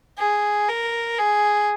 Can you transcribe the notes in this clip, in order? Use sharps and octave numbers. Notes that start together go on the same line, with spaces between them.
G#4
A#4
G#4